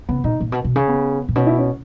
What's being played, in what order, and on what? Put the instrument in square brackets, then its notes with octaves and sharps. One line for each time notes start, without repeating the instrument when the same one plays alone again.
[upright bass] C#3 [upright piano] B3
[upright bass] A#2 [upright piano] D#4
[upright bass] A#2
B2
B2
C#3
[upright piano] B3
[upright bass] A#2
[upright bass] B2 [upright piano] C#4
[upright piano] E4
C#4